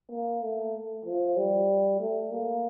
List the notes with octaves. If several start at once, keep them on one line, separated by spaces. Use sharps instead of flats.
A#3
A3
F3
G3
A3
A#3